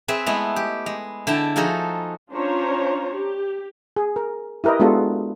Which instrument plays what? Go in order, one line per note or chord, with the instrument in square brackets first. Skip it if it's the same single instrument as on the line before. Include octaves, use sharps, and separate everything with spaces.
[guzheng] C4 G#4 B4 E5
G#3 A3 B3 E4
G4
G#3
D3 E4 G5 A5
F3 D#4 F#4 G#4 A4
[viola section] C#4 D4 F4 C5 C#5 A#5
G4
[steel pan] G#4
A#4
E4 G4 A#4 B4 D#5
G#3 B3 D4 F4 F#4 A4